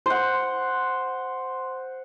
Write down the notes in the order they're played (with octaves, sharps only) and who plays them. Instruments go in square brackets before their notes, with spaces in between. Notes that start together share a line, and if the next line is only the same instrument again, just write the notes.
[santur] C5 F#5